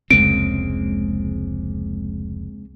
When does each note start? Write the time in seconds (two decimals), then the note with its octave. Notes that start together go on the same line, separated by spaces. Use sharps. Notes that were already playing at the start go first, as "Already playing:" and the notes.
0.11 F1 C#2 C#3 G#3 A#3 C4 D7